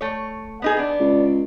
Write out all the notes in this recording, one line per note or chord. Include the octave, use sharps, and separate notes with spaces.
A3 C#5
B3 D#4 G#4
B3 D4
C#2